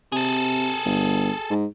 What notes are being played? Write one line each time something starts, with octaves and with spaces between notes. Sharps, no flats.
C3 G#4 A4
G1
G#2